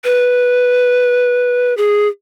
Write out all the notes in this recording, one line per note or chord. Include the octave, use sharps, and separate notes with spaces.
B4
G#4